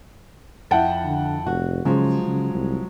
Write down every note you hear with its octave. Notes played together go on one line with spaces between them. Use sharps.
F2 E4 F#5 G5 A5
D3
F1 F#4
C#3 F3 F#3 G#3
C#3
C2